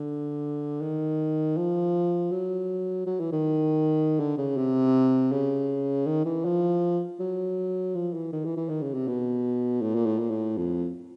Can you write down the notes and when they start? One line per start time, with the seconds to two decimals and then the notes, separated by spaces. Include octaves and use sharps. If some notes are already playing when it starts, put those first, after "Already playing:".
Already playing: D3
0.82 D#3
1.57 F3
2.31 F#3
3.06 F#3
3.20 E3
3.32 D#3
4.19 D3
4.38 C#3
4.57 C3
5.32 C#3
6.06 D#3
6.25 E3
6.45 F3
7.19 F#3
7.95 F3
8.14 E3
8.32 D#3
8.45 E3
8.57 E3
8.69 D#3
8.82 C#3
8.94 C3
9.07 B2
9.81 A2
9.95 A#2
10.06 A2
10.19 A#2
10.30 A2
10.57 F2